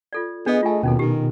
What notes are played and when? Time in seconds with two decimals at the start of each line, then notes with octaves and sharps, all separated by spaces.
0.13 F4 A4 D5
0.46 B3 D4 G#4 D#5
0.63 A3 F4 G#5
0.83 D#2 B2 C#4 D#4 A4
0.99 D#3 G4